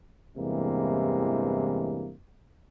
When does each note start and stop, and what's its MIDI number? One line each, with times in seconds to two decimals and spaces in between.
0.37 2.12 40
0.37 2.12 43
0.37 2.12 48
0.37 2.12 52
0.37 2.12 56
0.37 2.12 58